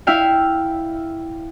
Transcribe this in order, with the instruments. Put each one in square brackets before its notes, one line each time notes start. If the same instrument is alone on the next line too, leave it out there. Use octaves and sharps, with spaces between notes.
[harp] E4 E5 F5 G5